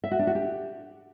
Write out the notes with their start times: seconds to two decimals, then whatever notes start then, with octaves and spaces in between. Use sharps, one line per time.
0.04 E5
0.11 F#4
0.19 D4
0.27 F#4
0.35 G4